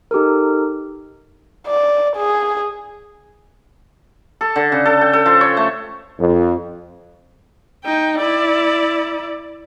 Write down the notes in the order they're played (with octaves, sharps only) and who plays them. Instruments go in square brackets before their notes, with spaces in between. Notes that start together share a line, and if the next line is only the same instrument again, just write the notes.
[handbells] D#4 G4 A4 A#4
[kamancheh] D5
G#4
[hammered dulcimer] A4
D3
C#3
A4
G5
A4
F3
C#5
A3
[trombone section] F2
[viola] D#4 G5
E4 D5